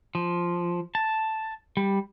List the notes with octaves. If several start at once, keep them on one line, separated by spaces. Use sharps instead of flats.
F3
A5
G3